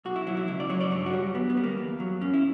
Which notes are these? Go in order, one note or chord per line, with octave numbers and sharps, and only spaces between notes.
B1 F#4
E4
F#3 E4
E4
C#2 E4
D5
F#3 C#5
D5
G2 C#5
F#4
G3
D2 B3
B3
G3
A#3
E2
F#3
F#2 C#4
E4